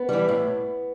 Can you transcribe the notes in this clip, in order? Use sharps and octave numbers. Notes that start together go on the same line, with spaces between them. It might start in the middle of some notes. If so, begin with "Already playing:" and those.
Already playing: B3
E3 G3
A2